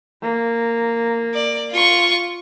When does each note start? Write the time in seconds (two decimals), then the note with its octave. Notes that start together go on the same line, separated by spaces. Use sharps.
0.22 A#3
1.35 D5
1.71 F4 C#6